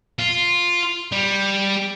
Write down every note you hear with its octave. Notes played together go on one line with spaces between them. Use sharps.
F4
G3